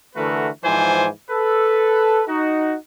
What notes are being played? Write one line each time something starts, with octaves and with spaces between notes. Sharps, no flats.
D3 E3 A3 F#4 A#4 B4
G#2 E3 F3 C5 D5 G#5
A4 B4
D#4 F#4